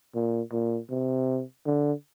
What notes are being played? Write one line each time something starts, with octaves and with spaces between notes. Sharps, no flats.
A#2
A#2
C3
D3